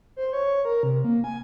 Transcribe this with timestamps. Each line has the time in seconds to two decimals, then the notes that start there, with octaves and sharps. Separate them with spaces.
0.16 C5
0.33 C#5
0.65 A#4
0.83 C3
1.04 A#3
1.24 G#5